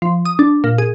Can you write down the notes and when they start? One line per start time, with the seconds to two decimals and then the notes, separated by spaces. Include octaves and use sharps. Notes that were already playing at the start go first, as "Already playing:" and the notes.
0.02 F3
0.25 D#6
0.39 D4
0.64 A#2
0.78 G#4